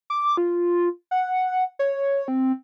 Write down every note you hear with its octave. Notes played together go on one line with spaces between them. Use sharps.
D6
F4
F#5
C#5
C4